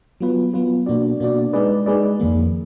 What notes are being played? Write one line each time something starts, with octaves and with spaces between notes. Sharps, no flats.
F#3 B3 F4 B4
F#3 B3 F4 B4
B2 A#3 D4 F#4 D5
B2 A#3 D4 F#4 D5
G#3 D#4 G#4 B4 D5
G#3 D#4 G#4 B4 D5
F2 D#3 A#3